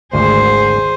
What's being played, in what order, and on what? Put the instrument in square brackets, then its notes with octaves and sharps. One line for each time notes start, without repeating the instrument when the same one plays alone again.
[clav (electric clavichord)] G#1 D2 [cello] G#4 C5